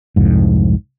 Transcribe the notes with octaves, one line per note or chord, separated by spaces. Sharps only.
C2 F2 G#2